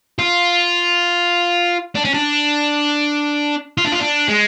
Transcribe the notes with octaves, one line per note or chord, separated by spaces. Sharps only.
F4
D4
C#4
D4
F4
D4
F4
D4
G#3